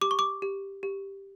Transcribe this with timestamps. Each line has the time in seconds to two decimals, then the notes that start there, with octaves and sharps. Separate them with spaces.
0.01 G4 D6
0.11 C#6
0.19 D6
0.42 G4
0.83 G4